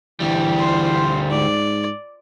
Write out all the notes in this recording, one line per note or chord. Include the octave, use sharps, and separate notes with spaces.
D2 E3 G3
F4 C5
G#2 D5